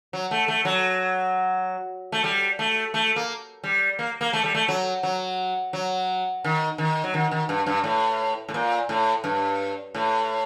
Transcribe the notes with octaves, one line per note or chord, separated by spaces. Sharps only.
F#3
A3
A3
F#3
A3
G3
A3
A3
A#3
G3
A#3
A#3
A3
G3
A3
F#3
F#3
F#3
D#3
D#3
F#3
D#3
D#3
G2
G2
A2
A2
A#2
A2
G2
A2